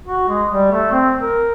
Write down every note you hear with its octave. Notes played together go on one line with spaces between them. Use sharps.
F#4
G#3
G3
A3
C4
A#4